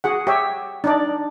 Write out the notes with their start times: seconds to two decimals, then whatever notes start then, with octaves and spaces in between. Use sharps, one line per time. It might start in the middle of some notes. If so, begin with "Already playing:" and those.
0.04 F#4 G#4 F#5
0.27 G4 C#5 E5
0.84 D4 D#4 D5